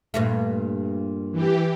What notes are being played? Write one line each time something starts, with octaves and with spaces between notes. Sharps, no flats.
G2 A#2 A3
E3 G4